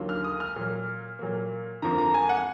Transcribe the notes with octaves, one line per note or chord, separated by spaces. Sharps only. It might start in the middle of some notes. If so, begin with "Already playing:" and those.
Already playing: D#2 D3 F#3 A#3 F4
F6
D#6
F6
A#2 F#3 A#3
A#2 F#3 A#3
F2 D3 F3 A#3 A#5
A#5
G#5
F#5